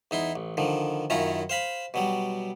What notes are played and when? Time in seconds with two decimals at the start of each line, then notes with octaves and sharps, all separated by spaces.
0.11 E2 D#4 E4 C6
0.36 A1
0.57 D3 D#3 F3
1.10 F#2 D#3 C#4 E4 F4 A#5
1.50 C5 F5 B5
1.94 B2 F#3 G3